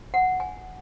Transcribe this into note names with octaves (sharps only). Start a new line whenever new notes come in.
F#5
G#5